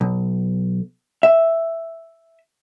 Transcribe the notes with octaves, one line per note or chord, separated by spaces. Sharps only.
B1
E5